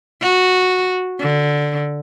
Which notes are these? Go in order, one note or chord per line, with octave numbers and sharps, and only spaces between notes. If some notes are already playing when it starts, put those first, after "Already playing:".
F#4
D3